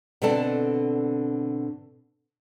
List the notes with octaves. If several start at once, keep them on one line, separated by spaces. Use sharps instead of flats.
B2 D3 C4 A4 D5 A5